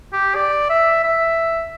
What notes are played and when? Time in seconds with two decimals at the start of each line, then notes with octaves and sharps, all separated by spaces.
0.13 G4
0.35 D5
0.70 E5
1.04 E5